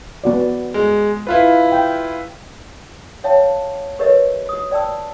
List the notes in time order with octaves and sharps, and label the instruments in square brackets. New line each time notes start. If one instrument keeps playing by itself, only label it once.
[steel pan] B3 F#4 D5
[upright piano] G#3
E4 F4 B4
[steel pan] G5
[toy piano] C#5 E5 F5 G5 A5
G4 A#4 B4 C#5 D#5 E5
F#4 D#6
D5 G5 A5 E6